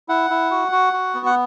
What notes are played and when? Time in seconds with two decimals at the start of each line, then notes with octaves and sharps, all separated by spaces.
0.09 E4 F#5
0.30 E4
0.51 F#4
0.72 F#4
0.93 F#4
1.14 B3
1.26 F#5